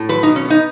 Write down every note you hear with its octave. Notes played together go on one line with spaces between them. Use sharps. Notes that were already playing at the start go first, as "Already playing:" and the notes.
Already playing: A2
F#3 B4
B2 D#4
C#4
B3
D#4